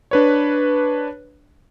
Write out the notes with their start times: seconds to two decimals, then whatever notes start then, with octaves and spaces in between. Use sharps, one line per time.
0.11 D4 B4 C#5